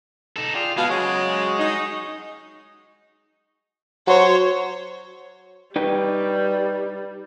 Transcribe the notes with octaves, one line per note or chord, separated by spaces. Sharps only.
D#4 A4
F4 G#4 D5 G5
B2 G#3 F5 G#5 A5 B5
C#3 F#3 F#4 G#4
D#4
F#3 C5 C#5
G3 D#4 B4 G5